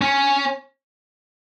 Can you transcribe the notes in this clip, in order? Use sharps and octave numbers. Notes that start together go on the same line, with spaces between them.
C#4